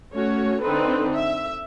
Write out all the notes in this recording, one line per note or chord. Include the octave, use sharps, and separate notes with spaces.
A3 C#4 F#4 C#5
D3 C4 D#4 A4 B4
E5